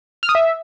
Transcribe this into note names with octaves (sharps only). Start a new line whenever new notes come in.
F6
D#6
E5